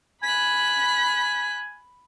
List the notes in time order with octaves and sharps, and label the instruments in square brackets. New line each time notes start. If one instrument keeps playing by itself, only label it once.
[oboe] G#5 [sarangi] B5 [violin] F#6 B6